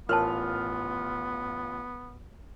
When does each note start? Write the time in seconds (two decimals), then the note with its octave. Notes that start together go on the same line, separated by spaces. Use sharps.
0.09 A1 B3 F4 A#4 C#5 A5 F6